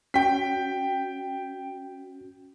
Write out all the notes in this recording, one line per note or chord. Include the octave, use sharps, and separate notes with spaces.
C#4 F#4 G5 B6